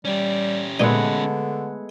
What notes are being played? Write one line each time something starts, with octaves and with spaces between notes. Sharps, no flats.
G3 C#4 G4
A#2 D3 G#3 A3 B3 D#4